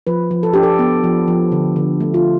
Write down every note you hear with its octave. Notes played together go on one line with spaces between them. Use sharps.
F3 B4
F3
A4
D4 G4
A4
B3
F3
F3
D3
D3
A3
F4